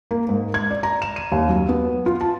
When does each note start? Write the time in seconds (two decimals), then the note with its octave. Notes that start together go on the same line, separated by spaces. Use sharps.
0.11 A#3
0.29 G#2
0.54 G#6
0.71 D5
0.83 A#5
1.02 E7
1.16 D#7
1.32 D#2
1.49 F#2
1.69 B3
2.06 F4
2.21 A5